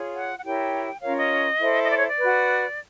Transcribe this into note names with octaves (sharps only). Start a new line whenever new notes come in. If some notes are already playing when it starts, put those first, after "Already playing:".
Already playing: F4 G#4 C#5
F#5
F#5
E4 G4 A#4 C#5 G5
C#4 F4 A#4 C#5 F5
D#5
E4 A4 C5
D#5
D5
C#5
D5
F#4 B4